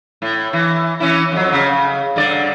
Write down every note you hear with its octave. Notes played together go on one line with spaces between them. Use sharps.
A2
E3
E3 C#4 E4
F2 F#3
C#3
G2 D3 D5